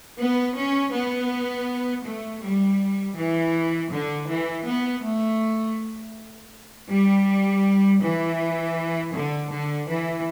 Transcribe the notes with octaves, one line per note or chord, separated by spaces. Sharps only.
B3
C#4
B3
A3
G3
E3
D3
E3
B3
A3
G3
E3
D3
D3
E3